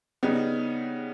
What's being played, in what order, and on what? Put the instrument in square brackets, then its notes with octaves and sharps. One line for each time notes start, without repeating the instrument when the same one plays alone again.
[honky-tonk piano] C#3 G3 B3 D#4